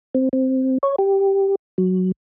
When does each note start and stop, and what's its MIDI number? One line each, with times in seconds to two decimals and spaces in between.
0.15 0.29 60
0.33 0.78 60
0.83 0.96 73
0.98 1.55 67
1.78 2.12 54